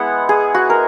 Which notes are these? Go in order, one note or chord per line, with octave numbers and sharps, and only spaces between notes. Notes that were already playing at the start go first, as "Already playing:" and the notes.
Already playing: G#3 B3 E4 F#5
G#4
F#4
A#4